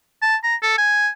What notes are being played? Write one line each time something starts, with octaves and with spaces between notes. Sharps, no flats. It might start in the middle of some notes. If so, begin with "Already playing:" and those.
A5
A#5
A4
G#5